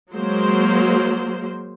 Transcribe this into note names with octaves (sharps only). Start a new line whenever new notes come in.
F#3 G#3 A#3 C5